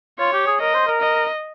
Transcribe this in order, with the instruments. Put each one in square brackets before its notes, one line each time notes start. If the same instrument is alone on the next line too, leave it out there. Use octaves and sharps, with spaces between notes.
[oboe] F4 [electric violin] C#5
[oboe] G4
G#4
[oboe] A#4 [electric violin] D#5
[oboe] C5
A#4
[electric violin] D#5